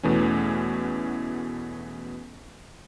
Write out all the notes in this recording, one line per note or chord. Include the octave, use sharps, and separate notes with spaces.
E2 B2 E3 A3 C#4